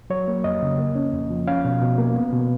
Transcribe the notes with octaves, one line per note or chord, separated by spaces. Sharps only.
F#3 C#5
A#3
F2 D#5
C#3
A#3
C#4
F2
F3
C#4 F5
B2
B2
A#3
B3
B2